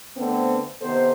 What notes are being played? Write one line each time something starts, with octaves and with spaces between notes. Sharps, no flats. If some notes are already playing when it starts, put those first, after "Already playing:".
D3 A3 B3 C4
C3 D#3 B3 A4 C5